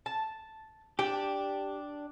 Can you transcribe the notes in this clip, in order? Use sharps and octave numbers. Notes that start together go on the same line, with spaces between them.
A5
D4 G4 G5